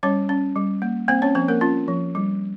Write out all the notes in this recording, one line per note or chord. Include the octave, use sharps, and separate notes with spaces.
G3 C#4 C#5
C#4
G3
A#3
A#3 C4 C5
C#4 C#5
F3 C4 C5
A#3 A#4
C#4 F4
F3
G3